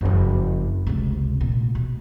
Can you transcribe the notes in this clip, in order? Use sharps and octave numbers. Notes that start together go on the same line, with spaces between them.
F#1 F2
C#2 C3
A#2
B2